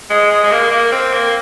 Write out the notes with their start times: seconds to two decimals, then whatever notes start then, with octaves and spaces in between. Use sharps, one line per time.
0.10 G#3
0.31 G#3
0.43 G#3
0.52 A#3
0.71 A#3
0.92 C4
1.13 A#3